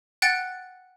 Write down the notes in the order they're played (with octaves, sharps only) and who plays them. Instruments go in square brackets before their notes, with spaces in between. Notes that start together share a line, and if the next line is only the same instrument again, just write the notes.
[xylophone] F#5 G5 F#6 A6 C#7